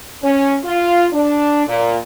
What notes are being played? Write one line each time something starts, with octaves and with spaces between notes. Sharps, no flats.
C#4
F4
D4
A#2